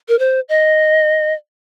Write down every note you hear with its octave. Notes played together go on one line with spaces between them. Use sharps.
A#4
C5
D#5